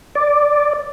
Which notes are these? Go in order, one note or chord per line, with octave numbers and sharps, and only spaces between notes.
D5